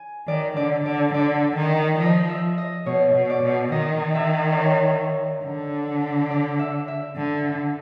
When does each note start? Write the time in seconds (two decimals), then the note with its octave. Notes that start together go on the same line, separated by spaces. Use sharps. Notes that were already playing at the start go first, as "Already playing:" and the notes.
Already playing: G#5
0.28 D#3 D5
0.56 D3 D5
0.85 D3 D5
1.14 D3 D5
1.57 D#3
2.00 F3 D#5
2.29 E5
2.58 D#5
2.86 B2 C#5
3.15 B2
3.29 D5
3.43 B2
3.72 D#3 D#5
4.15 E5
4.52 D5
4.58 C#5
5.44 D3
6.31 D5
6.59 E5
6.88 E5
7.17 D3